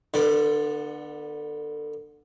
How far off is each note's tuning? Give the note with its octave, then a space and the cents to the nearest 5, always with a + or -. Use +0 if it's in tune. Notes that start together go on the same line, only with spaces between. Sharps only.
D3 +25 B3 -25 D5 +0